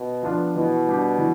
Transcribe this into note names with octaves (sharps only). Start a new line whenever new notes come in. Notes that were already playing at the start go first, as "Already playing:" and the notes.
Already playing: B2
F3 B3 D4 F4
B2 E3
G3 D4 G4
E3